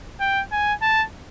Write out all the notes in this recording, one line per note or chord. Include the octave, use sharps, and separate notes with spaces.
G5
G#5
A5